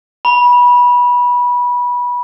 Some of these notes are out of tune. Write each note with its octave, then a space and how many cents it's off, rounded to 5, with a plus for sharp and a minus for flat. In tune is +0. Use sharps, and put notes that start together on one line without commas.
B5 -20